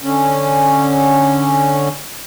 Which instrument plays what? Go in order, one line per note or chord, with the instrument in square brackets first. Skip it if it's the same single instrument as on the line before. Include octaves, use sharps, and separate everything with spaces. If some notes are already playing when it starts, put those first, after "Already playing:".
[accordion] D3 C#4